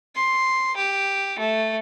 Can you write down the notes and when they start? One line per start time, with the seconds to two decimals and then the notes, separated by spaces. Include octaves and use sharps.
0.15 C6
0.76 G4
1.39 A3